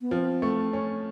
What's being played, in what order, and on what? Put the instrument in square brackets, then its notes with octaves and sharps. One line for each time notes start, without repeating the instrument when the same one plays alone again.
[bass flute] B3
[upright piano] F3 [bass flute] C4
[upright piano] A3
C#4